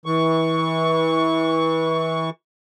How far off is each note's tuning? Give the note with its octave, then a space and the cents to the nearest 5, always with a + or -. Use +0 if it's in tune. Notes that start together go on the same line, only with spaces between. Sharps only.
E3 -25 C#6 +10